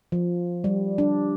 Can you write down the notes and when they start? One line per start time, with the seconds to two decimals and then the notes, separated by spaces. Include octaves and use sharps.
0.12 F3
0.64 G3
0.98 D4